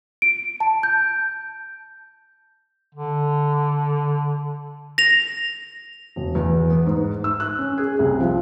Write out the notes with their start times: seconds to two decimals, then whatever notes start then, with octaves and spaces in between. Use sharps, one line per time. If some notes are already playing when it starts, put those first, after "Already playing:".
0.22 D7
0.60 A5
0.83 G6
2.95 D3
4.98 A#6 F7
6.16 E1
6.35 E2
6.70 B3
6.86 G#2
7.24 E6
7.40 F#6
7.58 C#4
7.78 G#4
7.99 C2
8.20 F3